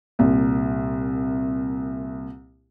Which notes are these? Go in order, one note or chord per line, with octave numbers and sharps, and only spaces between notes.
C2 A#2